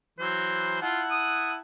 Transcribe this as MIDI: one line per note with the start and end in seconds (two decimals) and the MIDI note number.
0.19 0.80 52
0.19 0.80 54
0.19 0.78 72
0.82 1.57 64
0.82 1.01 65
0.82 1.57 78
0.82 1.57 81
1.11 1.53 87